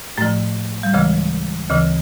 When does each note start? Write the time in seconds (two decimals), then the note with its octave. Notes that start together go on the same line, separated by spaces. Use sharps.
0.18 A2 F3 A3
0.83 G3
0.94 D2 C#3 E3 G#3
1.70 D2 C#3 E3